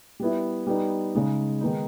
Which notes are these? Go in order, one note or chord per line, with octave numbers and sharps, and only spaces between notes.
G3 B3 E4
G3 B3 D#4
C#3 G#3 D#4
D#3 G#3 B3 D#4